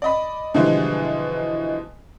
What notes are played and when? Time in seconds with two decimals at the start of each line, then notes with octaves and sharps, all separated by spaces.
0.02 D5 D#5 B5
0.54 B2 D3 E3 F3 G3 G#3